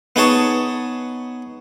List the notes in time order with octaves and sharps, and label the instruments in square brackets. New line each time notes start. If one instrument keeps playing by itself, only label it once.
[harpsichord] B3 D#4 G#4 C#5 A5